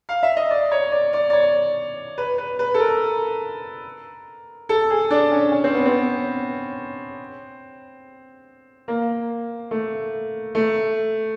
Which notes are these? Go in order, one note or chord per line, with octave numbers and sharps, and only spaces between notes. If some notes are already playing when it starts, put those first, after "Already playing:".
F5
E5
D#5
D5
C#5
D5
D5
D5
C#5
B4
B4
B4
A4
A#4
A4
G#4
D4
C#4
C#4
C4
B3
C4
A#3
A3
A3